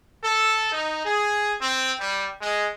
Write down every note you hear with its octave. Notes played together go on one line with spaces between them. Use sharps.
A4
D#4
G#4
C4
G3
G#3